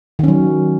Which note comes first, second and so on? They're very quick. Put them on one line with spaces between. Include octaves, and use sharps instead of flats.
D#3 C#4 F#3